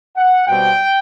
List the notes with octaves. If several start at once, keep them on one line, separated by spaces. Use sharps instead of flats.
F#5
B2 G3 C4 G5